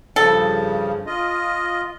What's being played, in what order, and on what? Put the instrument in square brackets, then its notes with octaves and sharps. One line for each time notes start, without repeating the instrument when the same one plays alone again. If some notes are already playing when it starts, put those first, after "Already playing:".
[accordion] G2 C#3 F3 [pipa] A4
[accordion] F4 D#5